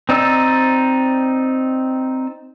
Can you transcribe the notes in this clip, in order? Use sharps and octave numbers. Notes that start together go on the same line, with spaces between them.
C4 D#4 D5 E6